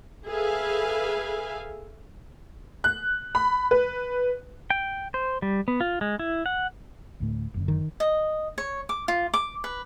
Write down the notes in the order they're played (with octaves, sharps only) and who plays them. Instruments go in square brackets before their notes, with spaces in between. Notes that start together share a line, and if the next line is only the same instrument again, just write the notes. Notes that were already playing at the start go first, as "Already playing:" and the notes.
[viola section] G#4 A4 B4 E5 F5 G#5
[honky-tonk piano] F#6
B5
B4
[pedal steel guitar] G5
C5
G3
B3
F4
G#3
E4
F#5
[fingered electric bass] D2 A2 A3
F#1 F#2 D3
[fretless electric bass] D#3
[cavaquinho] D#5
C#5
D6
F4
D6
B4